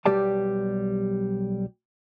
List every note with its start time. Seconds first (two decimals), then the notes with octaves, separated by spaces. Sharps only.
0.06 B1 G3 G4 D5 A5